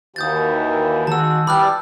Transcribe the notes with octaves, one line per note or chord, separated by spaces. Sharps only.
D#2 E3 F#4 D#6 G6 A6
D#3 G#3 F#4 A5 E6
E3 G3 B5 D6 F6 F#6